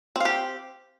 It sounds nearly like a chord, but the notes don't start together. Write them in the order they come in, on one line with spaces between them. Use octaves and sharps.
C4 F5 G4